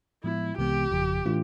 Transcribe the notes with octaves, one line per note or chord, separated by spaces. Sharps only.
A2 F3 G#3 B3 E4
C2 C3 E3 G#3 B3 G4
G1 F2 C#3 F3
A2 E3 A3 D4 F4